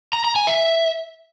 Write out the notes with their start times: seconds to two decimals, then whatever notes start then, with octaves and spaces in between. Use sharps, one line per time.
0.13 A#5
0.24 A#5
0.36 G#5
0.47 E5